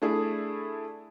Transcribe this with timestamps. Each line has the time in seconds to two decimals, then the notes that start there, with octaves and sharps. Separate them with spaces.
0.02 A3 D4 E4 G#4